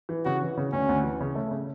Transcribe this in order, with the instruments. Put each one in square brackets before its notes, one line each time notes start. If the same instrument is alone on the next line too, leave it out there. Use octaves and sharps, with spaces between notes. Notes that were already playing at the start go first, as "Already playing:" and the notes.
[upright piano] E3
[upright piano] C#3 [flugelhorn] F#4
[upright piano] E3
C#3
[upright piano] D2 [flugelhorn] C#4
[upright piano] D2
E3
C#3
A3
C#3